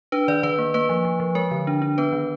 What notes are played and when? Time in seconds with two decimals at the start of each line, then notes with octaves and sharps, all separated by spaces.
0.12 D4 B4
0.28 D#3 D5
0.43 D#3 B4
0.58 A#3
0.74 A#3 B4
0.89 F3
1.05 F3
1.20 F3
1.35 G#3 A#4
1.51 D3
1.67 D4
1.82 D4
1.98 B3 B4
2.13 D#3